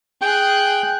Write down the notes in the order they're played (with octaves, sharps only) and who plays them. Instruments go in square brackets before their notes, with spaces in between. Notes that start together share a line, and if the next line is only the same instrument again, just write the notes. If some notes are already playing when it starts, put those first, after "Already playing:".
[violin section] G#4 F#6 [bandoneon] G5